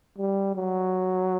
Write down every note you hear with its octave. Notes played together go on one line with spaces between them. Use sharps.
G3
F#3